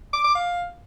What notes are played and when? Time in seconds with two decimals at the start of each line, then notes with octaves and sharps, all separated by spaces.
0.13 D6
0.24 D6
0.35 F5